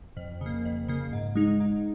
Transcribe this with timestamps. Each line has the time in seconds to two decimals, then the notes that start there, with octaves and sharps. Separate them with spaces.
0.17 F2
0.41 C#3 A#3
0.65 F2
0.88 C#3 A#3
1.13 G#2
1.35 G#3 D#4
1.60 G#2